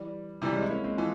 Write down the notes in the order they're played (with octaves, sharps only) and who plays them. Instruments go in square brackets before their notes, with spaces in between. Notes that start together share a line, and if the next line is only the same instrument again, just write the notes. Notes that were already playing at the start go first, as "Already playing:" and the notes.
Already playing: [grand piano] E3 G3
[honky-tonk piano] C3 E3 G3
[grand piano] C#4
G#3 C4
E4
A#3 C#4
G#3 C4
[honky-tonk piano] E3 [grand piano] F3 G#3